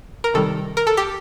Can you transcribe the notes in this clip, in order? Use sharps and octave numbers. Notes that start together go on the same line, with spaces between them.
A#4
C3 D#3 G3 A4
A#4
A4
G4